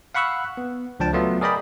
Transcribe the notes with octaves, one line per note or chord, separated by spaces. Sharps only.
F5 F#5 B5 C#6 E6 F#6
B3
C#2 F3 D4 G5 A5
F#3 A3 B3 F4 E5
G#4 A#4 D5 D#5 G5 B5